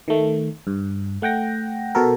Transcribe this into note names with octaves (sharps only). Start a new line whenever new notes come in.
D#3 A3
G2
A3 F#5 G5 A#6
B2 F#4 A4 A#4